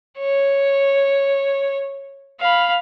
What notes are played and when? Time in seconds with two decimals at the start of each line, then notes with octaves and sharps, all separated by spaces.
0.18 C#5
2.40 F5 B5